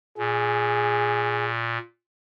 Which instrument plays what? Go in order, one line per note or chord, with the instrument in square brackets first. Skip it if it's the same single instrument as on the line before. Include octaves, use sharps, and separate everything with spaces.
[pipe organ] A#2 [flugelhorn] G#4